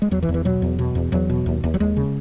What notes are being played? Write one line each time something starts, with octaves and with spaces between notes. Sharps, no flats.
G#3
E2 F#3
E3
E2
E3
B2 F#3
E2
B2
E2
E2 F#3
B2
D#2
D#2
F#3
D#2 G#3
C#3